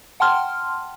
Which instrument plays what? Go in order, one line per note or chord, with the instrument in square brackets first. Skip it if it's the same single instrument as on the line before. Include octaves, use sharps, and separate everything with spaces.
[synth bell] F#5 G5 A5 C6 F6